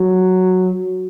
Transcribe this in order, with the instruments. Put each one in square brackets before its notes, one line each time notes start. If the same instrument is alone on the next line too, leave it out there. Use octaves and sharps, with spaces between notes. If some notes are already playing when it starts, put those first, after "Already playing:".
Already playing: [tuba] F#3